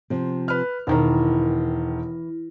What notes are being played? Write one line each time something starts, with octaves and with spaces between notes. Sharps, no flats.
C3 F3
B4 F6
E1 D#3 E3 A#4